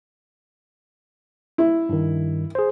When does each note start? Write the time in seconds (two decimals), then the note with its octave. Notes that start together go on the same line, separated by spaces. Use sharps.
1.58 E4
1.89 G2 D#3
2.55 G#4 C5